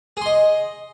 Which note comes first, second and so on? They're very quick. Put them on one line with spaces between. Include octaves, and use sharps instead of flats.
G#4 C6 D#5